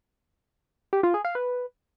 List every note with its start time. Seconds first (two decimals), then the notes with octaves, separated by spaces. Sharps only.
0.93 G4
1.03 F4
1.14 G#4
1.25 F5
1.35 B4